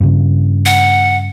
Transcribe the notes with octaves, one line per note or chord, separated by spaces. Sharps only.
G2 C#3
F#5